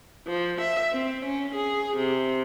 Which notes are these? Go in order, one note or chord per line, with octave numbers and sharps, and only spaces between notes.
F3
E5
C4
C#4
G#4
C3